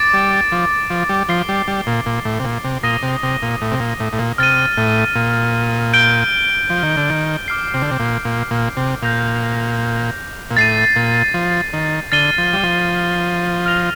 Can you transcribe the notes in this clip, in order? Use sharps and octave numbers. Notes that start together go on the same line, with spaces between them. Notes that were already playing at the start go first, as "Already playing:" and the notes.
Already playing: D6 A6 D7
G3
F3
F3
G3
F3 A6 C7 G7
G3
G3
A#2
A#2
A2
C3
A#2
C3
A#2 D#6 A#6 D#7 G7
C3
C3
A#2
A2
C3
A#2
A2
A2
A#2
C3 F6 A6 D#7
A2
A#2
G6 D7 G7
F3
D#3
D3
D#3
D6 F6 C7
C3
D3
C3
A#2
A#2
A#2
C3
A#2 G6 A#6 F7
A#2
A2 A6 C7 D#7
A#2
F3
D#3
D3 F6 A6 C7 D#7 G7
F3
G3
F3
F6 A#6 F7